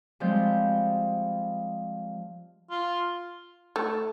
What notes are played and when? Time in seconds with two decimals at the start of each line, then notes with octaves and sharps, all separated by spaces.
0.20 F3 G3 G#3 C4 G6
2.71 F4
3.76 A3